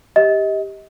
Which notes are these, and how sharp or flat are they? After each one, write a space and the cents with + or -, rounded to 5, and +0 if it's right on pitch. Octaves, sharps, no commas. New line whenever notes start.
G4 +5 D#5 +30